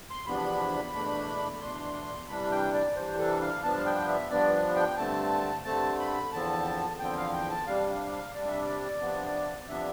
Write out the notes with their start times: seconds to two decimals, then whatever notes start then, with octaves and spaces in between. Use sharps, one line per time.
0.10 C6
0.26 E2 C3 F3 B3 D4 B5
0.94 E2 B2 A3 D4
1.61 E2 B2 A3 D4 C6
2.28 C3 E3 G3 D4 B5
2.51 G5
2.74 D5
2.96 C3 E3 G3 D4 C5
3.19 A4
3.41 F5
3.63 G2 F3 B3 D4 A5
3.78 F5
3.86 G5
4.08 E5
4.30 G2 F3 B3 D4 D5
4.75 G5
4.97 G2 D3 A3 C4 A5
5.65 G2 D3 A3 C4 A5
5.99 B5
6.32 E2 D3 F3 C4 A5
6.99 E2 D3 F3 C4 G5
7.17 F5
7.33 G5
7.50 A5
7.67 C3 G3 D4 F5
7.89 F5
8.12 F5
8.34 C3 G3 D4 D5
8.48 E5
8.62 D5
9.01 C3 F3 B3 D4
9.68 C3 F3 B3 D4 E5